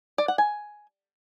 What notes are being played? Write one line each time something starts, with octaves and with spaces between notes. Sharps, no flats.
D5
F#5
G#5